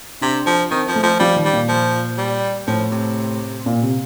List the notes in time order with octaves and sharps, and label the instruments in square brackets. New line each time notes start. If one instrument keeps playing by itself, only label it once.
[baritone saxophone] C3 [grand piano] D4
[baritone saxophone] F3
[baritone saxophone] D#3 [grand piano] C4
[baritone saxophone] F3
[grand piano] A3
[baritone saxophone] F3
[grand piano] F3 [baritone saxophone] G3
[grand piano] D#3
[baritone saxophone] G3
[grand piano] A#2
[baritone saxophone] F3
G3
[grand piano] A2 [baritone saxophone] F3
[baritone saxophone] C3
[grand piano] A#2
C3